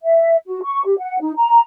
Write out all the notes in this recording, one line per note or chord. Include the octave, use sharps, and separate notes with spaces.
E5
F#4
C#6
G4
F#5
D#4
A#5